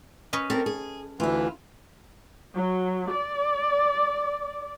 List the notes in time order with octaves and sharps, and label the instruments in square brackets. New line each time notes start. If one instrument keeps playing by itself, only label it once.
[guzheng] C#4 B4 D#5
[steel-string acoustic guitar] C4 G4 A#4 [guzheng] A4
[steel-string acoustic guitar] G#4
[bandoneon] D2 E3 [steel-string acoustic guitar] E4 F4
[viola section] F#3
D5